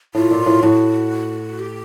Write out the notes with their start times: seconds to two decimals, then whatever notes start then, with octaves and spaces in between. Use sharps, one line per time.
0.14 A2 F4
0.31 A#2
0.46 A2
0.63 A2 F#4
1.59 G4